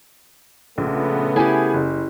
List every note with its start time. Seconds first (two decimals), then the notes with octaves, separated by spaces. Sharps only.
0.78 A#1 C#3 A3 B3
1.36 E4 G4 G#4 G#5
1.74 F#1